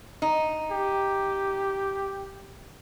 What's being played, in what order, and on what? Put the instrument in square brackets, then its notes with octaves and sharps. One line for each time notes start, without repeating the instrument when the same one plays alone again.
[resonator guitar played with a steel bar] D#4
[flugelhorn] G4